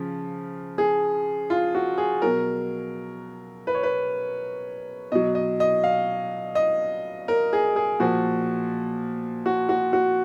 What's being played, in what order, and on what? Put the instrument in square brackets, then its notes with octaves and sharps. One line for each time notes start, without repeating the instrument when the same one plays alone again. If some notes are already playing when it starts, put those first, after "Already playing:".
Already playing: [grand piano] C#3 F3
G#4
F4
F#4
G#4
B2 F#3 A#4
B4
C#5
B4
B2 F#3 D#5
D#5
D#5
F5
D#5
A#4
G#4
G#4
A#2 F3 F#4
F#4
F#4
F#4